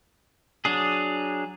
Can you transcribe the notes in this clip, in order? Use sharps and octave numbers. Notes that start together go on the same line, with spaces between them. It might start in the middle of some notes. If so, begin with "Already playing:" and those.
F#3 D4 G#4